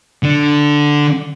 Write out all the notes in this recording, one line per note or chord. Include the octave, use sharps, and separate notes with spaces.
D3 D4